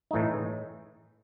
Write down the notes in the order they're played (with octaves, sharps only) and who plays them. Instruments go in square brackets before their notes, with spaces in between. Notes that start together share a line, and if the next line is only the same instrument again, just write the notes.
[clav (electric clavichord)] A2 E3 A3 D#4